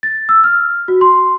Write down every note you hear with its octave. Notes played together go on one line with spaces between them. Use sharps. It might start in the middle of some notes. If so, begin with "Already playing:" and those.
A6
E6
F6
F#4
C6